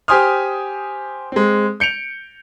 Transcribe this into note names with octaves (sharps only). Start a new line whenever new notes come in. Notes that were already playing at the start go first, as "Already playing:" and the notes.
G4 C5 G#5 C6 D#6 F6
G#3 C4
G6 C#7 D7 F7